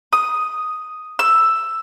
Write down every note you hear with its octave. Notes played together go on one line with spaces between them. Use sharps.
D#6
E6